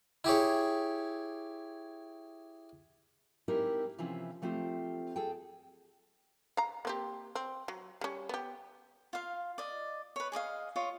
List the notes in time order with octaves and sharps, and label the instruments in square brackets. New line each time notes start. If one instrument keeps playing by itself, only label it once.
[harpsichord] E4 G4 G#4 C#5
[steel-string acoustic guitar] G#3 C4 D#4 E4 G4 A#4
C3 E3 F3 C4 C#4 E4
F3 A3 C4 F4 G4
G#4 A4 G5
[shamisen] F5 A#5
A#3 C4 G4
C4
F#3
G3 C#4
B3 G4
[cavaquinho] F4 F5
D5 D#5
B4 C#5
G#4 D5 D#5 F5
F4 C#5 D#5